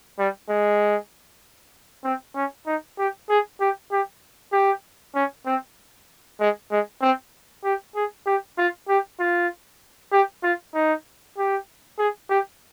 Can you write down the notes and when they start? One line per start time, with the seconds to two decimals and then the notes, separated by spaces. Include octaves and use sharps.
0.19 G3
0.50 G#3
2.04 C4
2.36 C#4
2.66 D#4
2.98 G4
3.29 G#4
3.60 G4
3.92 G4
4.53 G4
5.15 C#4
5.46 C4
6.40 G#3
6.71 G#3
7.02 C4
7.64 G4
7.95 G#4
8.27 G4
8.58 F4
8.89 G4
9.20 F4
10.12 G4
10.43 F4
10.75 D#4
11.38 G4
11.99 G#4
12.30 G4